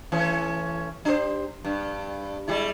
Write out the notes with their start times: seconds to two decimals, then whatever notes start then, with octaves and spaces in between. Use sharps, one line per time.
0.12 E3 A3 C#4
1.05 D4 G4 C5
1.65 G2
2.48 G3 G#3 E4